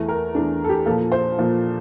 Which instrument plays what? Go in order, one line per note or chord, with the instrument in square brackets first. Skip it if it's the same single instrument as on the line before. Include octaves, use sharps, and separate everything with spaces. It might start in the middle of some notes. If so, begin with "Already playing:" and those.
Already playing: [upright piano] E2 E3 A3
A#4
E2 E3 A3 D4
A4
G4
A#2 F3 A#3 A4
C5
A#2 F3 A#3